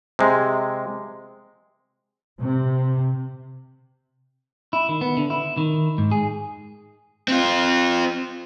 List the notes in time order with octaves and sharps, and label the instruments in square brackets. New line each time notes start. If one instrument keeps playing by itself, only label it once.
[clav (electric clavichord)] C3 G#3
[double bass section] C3
[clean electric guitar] E4
D#3
B3
D3
E4
D#3
G#2
G#4
[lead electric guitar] C4 F4